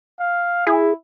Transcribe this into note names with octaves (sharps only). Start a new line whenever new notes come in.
F5
E4 G#4